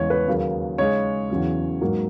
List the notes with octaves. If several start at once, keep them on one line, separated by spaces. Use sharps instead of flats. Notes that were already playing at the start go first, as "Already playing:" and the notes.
Already playing: E2 C#3 G#3 C#5
B4
D#2 C#3 F#3 A#3
C#3 G#3 D#4 C#5
E2 C#3 F#3 C#4
G#2 F#3 A#3